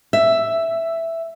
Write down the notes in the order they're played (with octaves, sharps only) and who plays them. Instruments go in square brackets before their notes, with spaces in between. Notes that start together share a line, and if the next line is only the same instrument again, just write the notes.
[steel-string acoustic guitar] E5